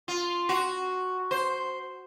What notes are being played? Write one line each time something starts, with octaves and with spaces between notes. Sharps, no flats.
F4
F#4
C5